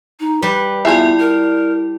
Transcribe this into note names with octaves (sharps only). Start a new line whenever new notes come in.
D#4
G3 B4
B3 E4 F4 G#4 D5 E5
A#4